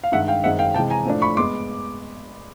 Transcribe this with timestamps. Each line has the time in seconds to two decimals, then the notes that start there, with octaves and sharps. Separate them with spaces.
0.04 F5
0.12 G2 D#3 G#3 E5 F#5
0.28 F5 G5
0.44 F#2 D#3 G#3 C4 E5 F#5
0.59 F5 G5
0.74 C3 E3 G#3 G5 A5
0.90 G#5 A#5
1.06 A2 F3 A3 D4
1.22 B5 C#6
1.37 G#3 B3 C6 D6